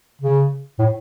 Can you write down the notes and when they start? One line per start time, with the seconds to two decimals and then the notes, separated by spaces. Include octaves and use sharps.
0.22 C#3
0.79 A2